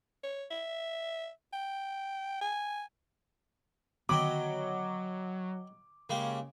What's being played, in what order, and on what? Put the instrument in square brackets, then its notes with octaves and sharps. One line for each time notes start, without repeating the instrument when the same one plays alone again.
[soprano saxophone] C#5
E5
G5
G#5
[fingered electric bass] D3 D#3 B3 [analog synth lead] F#3 [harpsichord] D#5 G5 B5 [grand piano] D6
[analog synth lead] C#3 [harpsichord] G#3 A#3 G4